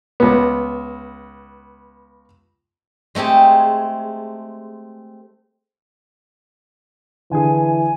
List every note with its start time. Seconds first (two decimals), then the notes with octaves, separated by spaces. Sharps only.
0.20 C#2 B3
3.15 G#3 A3 C4 G4 G#4
7.31 D3 E3 G#4 G#5